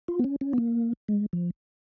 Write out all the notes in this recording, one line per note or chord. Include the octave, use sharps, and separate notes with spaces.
F4
B3
C#4
C#4
B3
A#3
G#3
F3